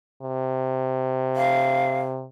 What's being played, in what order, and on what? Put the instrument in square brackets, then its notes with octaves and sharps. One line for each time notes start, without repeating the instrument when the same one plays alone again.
[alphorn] C3
[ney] F5